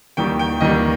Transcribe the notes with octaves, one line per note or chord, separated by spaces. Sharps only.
D#2 D#3 G3 G5
G5
D#2 D#3 G3 D#5